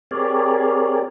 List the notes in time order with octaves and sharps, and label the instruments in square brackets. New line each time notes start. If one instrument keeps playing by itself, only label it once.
[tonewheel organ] C4 G4 G#4 A#4 C#5 D5